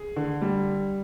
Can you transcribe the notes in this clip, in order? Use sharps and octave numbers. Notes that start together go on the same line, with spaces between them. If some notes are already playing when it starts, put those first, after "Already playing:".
Already playing: G#4
D3
G3